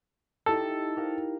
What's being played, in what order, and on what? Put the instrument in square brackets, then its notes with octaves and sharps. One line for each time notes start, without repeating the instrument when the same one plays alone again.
[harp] D#4 E4 G4 [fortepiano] A4
[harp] G4 A#4 F5